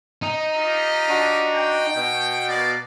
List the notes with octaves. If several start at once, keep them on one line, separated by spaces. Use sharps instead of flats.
D#4
F4 G4 D#5
D4 F#4
G5
B2
A#3 D5